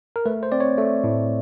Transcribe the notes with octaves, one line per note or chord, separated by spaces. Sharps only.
A#4
A3 B4
C5
C4 D5
C#5
A3
A2